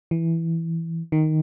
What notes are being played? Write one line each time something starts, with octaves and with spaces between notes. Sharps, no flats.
E3
D#3